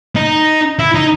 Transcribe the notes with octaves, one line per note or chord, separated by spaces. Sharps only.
D#4
E4
D#4